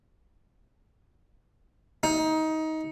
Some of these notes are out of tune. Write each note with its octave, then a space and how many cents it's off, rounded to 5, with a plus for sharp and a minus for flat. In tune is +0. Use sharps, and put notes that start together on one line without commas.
D#4 +20